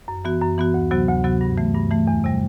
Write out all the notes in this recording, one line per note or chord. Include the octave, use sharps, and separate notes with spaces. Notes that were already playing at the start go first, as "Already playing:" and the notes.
F#2
E3 B3 F#4
F#2
E3 B3 F#4
D2
C3 F#3 B3 F#4
D2
C3 F#3 B3 F#4
G2
E3 A3
G2
E3 A3
E2
C3 G3